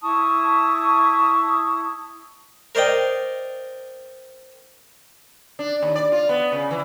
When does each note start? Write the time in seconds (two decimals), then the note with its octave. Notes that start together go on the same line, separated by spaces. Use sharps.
0.01 E4 A5 C#6 D#6
2.75 A#4 C5 D5 D#5 G5
5.59 D4
5.82 D#2
5.95 D5
6.12 F4
6.29 B3
6.52 C#3
6.71 E3